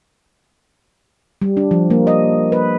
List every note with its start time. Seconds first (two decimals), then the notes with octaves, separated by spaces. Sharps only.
1.42 G3
1.57 D4
1.71 F3
1.90 A#3
2.07 D#5
2.52 B4